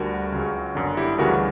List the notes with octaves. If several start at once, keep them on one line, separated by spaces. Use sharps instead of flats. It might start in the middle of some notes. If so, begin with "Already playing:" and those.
Already playing: D2 D3 G3 F#4 A#4
C#2 C#3 F#3
G1 F#2 D3
E4 G4
D2 C#3 E3 G3 F#4 A#4